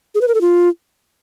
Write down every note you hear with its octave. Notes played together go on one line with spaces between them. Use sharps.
G#4
B4
A#4
A4
F4